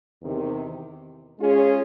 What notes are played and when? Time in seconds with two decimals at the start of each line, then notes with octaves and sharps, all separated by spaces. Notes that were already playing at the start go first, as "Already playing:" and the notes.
0.22 E2 C3 D#3
1.38 G#3 C#4 F4 G#4 C#5